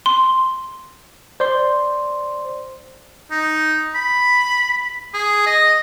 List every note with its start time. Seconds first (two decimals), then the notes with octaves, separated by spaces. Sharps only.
0.06 C6
1.40 C5 D5 C6
3.31 D#4
3.95 B5
5.14 G#4
5.46 D#5